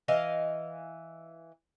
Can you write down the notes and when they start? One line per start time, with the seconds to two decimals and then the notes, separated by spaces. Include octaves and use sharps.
0.08 E3 D#5 F5